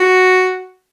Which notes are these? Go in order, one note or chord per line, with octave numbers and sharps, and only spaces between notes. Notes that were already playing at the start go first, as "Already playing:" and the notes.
Already playing: F#4